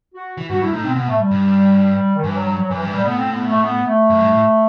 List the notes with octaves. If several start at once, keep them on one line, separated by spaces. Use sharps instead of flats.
F#4
E3
G2 F#4
G2 E4
A2 D#4
B2 C4
B2 B3
A2 A3
G3
G2
D#3
G2 E3
F#3
F#3
F#3
F#2 E3
G2 E3
A2 G3
A2 B3
C4
B3
A3
B3
A3
F#2
G2
A2